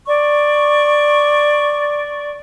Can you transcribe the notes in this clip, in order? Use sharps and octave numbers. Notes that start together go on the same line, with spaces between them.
D5 C#6